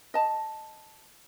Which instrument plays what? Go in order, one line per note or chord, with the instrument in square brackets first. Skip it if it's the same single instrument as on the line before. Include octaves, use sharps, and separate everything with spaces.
[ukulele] D#5 A5